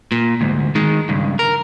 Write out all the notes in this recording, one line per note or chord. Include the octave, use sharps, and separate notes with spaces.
A#2
D2 G#2
D#3 G#3
C#2 G2
A#4